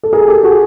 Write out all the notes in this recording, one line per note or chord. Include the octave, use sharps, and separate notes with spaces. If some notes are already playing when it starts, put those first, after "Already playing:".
A4
G#4 A#4
G4 A4
F#4 G#4